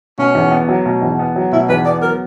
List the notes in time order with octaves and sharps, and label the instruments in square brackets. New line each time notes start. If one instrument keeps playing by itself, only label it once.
[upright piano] B2 [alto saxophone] C#4
[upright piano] E2
B3
F#3
B2
E2
B3
F#3
[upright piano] B2 [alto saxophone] E4
[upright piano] E2 [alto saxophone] B4
[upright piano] B3 [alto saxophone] D5
[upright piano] F#3 [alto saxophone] A#4